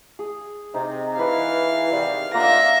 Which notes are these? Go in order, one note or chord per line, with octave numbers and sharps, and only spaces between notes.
G#4
C3 D#4
E3 B4 F5
C3 D#3 G3 F#5
D3 A#3 D#4 F4 D5 E5 F#5 A#6